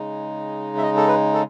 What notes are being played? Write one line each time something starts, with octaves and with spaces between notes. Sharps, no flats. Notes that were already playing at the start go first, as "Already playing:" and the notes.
Already playing: C#3 G#3 D#4
E5
D#5
A4
B4
A4